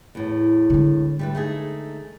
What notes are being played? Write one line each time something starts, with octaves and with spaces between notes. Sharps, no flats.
E2 A2
D3 G#3
G3 A3 B4
A3 D#4 G#4